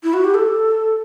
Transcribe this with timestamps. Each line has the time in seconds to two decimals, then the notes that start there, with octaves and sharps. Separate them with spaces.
0.03 E4
0.14 F#4
0.24 G4
0.34 A4